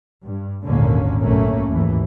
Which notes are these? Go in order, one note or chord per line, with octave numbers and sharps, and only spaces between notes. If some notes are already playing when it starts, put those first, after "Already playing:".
G2
G#1 D#2 A#2 D3 A#3 C#4
A#1 F#2 F#3 A3 A#3 C#4
D#2 G#2 E3